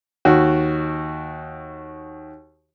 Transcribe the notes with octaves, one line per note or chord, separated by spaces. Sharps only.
D#2 F#4